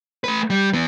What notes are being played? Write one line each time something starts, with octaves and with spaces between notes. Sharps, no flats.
A3 B4
G3
E3 B3